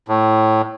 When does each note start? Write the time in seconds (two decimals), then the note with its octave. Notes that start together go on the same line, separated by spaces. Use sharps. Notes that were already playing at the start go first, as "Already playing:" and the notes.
0.08 A2